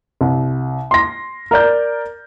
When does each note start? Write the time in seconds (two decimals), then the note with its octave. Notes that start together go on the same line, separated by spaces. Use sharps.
0.21 C2
0.91 C6 A#6
1.51 A#4 D5 G6